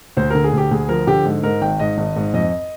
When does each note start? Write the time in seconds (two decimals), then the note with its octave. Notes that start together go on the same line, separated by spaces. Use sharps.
0.17 D2 C5
0.30 D3 A#4
0.44 G#4
0.53 D2 G4
0.71 D2 G#4
0.89 F3 A#4
1.07 D3 G4
1.25 G#2
1.43 G#2 A#4
1.62 G#1 G5
1.80 G#2 D#5
1.98 G#1
2.16 G#2
2.34 F2 D#5